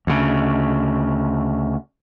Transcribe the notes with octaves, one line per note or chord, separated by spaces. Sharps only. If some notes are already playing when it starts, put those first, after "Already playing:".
D2 C#3